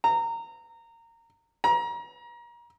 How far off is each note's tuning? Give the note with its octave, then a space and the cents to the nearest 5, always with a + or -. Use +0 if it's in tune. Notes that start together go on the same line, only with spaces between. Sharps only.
A#5 -20
A#5 +30